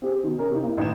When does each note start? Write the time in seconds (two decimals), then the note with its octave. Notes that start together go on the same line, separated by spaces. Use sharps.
0.02 C4 G4 G#4
0.23 B2 D#3
0.38 C#4 G#4 A#4
0.51 C3 D#4
0.63 A#3 E4
0.77 A1 D#3 G#6 E7